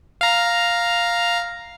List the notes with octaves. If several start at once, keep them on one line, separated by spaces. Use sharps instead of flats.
F5 A#5